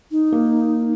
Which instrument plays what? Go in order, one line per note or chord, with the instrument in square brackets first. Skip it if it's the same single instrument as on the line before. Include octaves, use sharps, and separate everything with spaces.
[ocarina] D#4
[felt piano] A#3